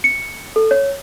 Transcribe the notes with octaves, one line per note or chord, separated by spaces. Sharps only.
C#7
A4
C#5